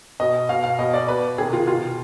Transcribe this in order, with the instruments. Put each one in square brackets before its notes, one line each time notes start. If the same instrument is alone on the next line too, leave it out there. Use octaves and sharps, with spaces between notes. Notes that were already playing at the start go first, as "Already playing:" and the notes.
[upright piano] B2 D#5
B2 F5
F5
B2 D#5
D5
B2 B4
C3 D#3 G#4
F4
B2 F4